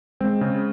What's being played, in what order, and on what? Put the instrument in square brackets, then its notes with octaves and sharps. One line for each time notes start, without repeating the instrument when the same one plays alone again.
[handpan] G#3 [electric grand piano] C4
[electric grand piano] C#3